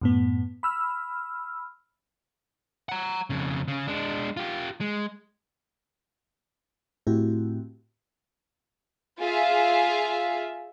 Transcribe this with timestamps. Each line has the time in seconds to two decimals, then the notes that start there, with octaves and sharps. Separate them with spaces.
0.01 F#2 A2 B3
0.63 B5 E6 F6
2.89 F#5 A#5
3.30 F2 C#3
3.68 C#3 C#4
3.87 G#3 D4
4.37 F4 G4
4.81 G#3
7.07 A2 A3 C4 E4 F#4 G4
9.19 F4 G#4 E5 F5